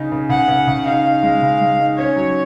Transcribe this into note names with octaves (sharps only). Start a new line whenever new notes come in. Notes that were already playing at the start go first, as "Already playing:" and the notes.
Already playing: C#3 D#4
C#3
C#3 F#5
C#3
C#3
D#4 F5
D#4
G#3
C#3
G#3
D#4
C#4 C#5
F#3